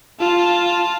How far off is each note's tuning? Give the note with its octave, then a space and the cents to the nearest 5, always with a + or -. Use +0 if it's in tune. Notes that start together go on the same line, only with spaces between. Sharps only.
F4 +0 A5 +0